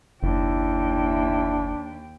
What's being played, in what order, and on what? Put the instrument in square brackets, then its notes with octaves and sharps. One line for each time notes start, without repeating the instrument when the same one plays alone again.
[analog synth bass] F#1 [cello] D#2 G5 [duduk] D4 [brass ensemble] E4